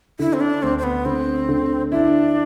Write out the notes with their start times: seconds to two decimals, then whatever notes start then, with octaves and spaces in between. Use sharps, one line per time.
0.19 D3 E4
0.33 C4
0.40 D4
0.62 D2 C4
0.78 C4
0.83 B3
1.05 D3 C4
1.49 D3
1.92 D4 E4